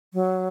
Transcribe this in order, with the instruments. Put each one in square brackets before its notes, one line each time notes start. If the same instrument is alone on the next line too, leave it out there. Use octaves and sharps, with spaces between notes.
[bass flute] F#3